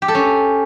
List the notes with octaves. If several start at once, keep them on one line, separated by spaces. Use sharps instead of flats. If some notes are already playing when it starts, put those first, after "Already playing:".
G4
A4
C#4